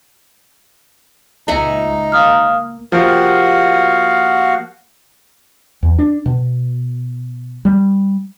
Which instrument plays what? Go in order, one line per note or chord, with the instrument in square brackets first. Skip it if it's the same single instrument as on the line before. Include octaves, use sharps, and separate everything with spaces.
[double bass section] C#2 A#2 [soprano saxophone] D#4 [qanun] E5 F#5 G#5
[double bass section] A#3 [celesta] F5 D#6 F6
[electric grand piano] F3 [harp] A#3 G4 [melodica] F#4 F5 F#5
[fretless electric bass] E2
D4
B2
G3